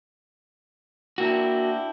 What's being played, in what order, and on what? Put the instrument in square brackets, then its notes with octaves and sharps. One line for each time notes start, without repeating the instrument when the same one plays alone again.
[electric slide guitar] A#3 F#4 [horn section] D4 E4 G5